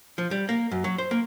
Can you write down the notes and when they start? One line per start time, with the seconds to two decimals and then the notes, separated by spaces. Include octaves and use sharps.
0.18 F3
0.31 G3
0.49 A#3
0.71 F#2
0.84 F#3
0.98 C5
1.11 A#3